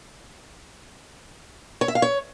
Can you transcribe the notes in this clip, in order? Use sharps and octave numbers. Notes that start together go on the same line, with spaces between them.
C#5
E5
F5
C#5